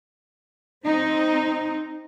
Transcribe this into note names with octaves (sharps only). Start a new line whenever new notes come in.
C4 D#4